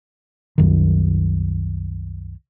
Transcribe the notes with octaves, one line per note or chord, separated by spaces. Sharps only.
C2 F#2 D#3